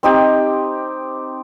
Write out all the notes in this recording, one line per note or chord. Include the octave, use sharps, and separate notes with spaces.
C4 D#4 G4